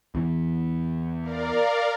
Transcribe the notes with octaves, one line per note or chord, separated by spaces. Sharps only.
E2 E3
A#4 D5 F5